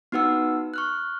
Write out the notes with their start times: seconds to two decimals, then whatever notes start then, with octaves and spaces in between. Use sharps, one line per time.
0.12 B3 D#4 F#4 B4 F#5 E6
0.74 C#6 F6 F#6